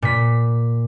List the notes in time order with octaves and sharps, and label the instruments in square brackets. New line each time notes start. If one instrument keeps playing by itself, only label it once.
[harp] A#2 B6